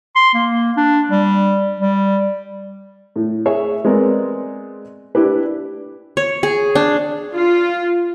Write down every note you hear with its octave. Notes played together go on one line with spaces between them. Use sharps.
C6
A#3
D4
G3
G3
A2
G#4 C#5 E5
G#3 B3 C4 A#4 D5
D4 E4 G4 B4
C#5
G#4
D4
F4